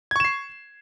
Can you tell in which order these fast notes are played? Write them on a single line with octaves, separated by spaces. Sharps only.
G#6 C#6 E7 C7